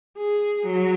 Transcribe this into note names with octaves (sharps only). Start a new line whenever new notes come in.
G#4
F#3